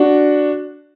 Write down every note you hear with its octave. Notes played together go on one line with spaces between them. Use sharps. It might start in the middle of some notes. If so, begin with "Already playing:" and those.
Already playing: D4 F#4